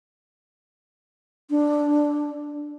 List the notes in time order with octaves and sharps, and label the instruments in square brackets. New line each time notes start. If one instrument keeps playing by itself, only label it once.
[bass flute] D4